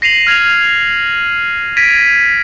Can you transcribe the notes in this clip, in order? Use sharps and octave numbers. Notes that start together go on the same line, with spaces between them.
A#6 C7 D#7 F7 F#7
F6 G#6 A#6 F7
G#6 A#6 B6 D7 D#7